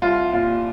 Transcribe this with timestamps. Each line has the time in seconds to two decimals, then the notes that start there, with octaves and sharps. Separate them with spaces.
0.02 C2 F4
0.33 A#2 G3 F4